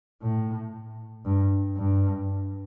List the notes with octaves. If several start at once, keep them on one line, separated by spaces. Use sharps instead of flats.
A2
G2
G2